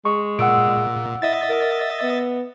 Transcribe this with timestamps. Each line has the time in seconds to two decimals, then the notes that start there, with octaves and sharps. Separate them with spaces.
0.05 G#3 C#6
0.39 A#2 F#5 E6 D7
1.22 E4 D#5 E5 A6
1.49 A#4
2.03 B3